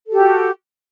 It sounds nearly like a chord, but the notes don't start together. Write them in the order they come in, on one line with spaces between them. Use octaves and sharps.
A4 G4 F#4